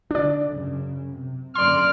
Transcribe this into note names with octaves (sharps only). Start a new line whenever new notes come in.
D3 D4 D5
F#2 C#3
C3
F#2 D3 A#3 D5 C6 F6